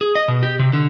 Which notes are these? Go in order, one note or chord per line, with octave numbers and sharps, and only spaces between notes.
G#4
D#5
B2
G4
C3
D3